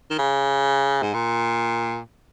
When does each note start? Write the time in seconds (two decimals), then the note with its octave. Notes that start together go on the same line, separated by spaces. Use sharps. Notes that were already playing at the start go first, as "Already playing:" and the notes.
0.10 D#3
0.18 C#3
1.03 G#2
1.14 A#2